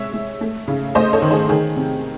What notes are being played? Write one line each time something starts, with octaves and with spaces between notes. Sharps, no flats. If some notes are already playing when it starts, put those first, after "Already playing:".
Already playing: C3 G#3 C#5 E5
G#3
A3
C#3
A3 C5 D#5
A4 C#5
D#3
G#4 C5
D#3 G#4
C3